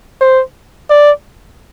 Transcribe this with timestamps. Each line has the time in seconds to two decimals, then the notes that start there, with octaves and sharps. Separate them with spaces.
0.21 C5
0.90 D5